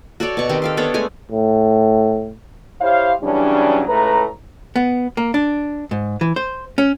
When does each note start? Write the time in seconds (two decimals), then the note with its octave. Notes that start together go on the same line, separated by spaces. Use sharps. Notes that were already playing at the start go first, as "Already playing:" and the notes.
0.20 F#4 A4 C#5 D5
0.37 B2 C#6
0.49 D#3 C4 G4 C6
0.62 A4 F5 C6
0.77 B3 D4 A4 C#5
0.94 G#3 A3 G#5
1.32 A2
2.81 E4 G4 C5 C#5 F5
3.22 C#3 E3 F#3 G3 C#4 D4
3.87 C#2 A2 A3 B4 A#5
4.76 B3
5.17 A#3
5.34 D4
5.91 G#2
6.21 E3
6.36 C5
6.78 C#4